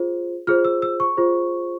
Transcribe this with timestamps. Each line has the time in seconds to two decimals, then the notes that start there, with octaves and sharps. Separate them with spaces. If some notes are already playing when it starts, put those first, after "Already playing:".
Already playing: F4 G#4 C5
0.47 F4 G#4 C5 F6
0.65 E6
0.82 E6
1.00 C#6
1.17 F4 G#4 C5